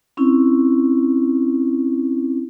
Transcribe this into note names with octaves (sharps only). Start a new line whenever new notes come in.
C4 C#4 E4